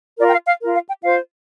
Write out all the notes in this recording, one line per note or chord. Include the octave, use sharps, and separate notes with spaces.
F4 A#4 D5
G5
F5
F5
F4 A#4
F5
G5
F4 C5 F5